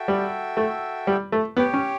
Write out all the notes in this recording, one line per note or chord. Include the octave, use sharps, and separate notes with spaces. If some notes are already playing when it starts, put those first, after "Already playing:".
Already playing: F#4 A4 E5 G5
G3
A3
G3
A3
B3 G4 C#5 G5
C#4